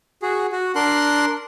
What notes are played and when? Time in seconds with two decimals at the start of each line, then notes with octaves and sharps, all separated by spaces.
0.22 F#4 G#4
0.52 F#4
0.76 D4 A#4 C6 F#6